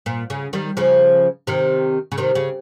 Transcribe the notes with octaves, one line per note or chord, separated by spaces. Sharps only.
A#2
C#3
D#3 G3
C#3 F3
C3 D#3
C#3
C3 D#3
C#3